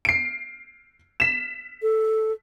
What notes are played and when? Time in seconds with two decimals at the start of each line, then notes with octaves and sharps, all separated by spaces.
0.05 C7 D7
1.20 B6 E7
1.82 A4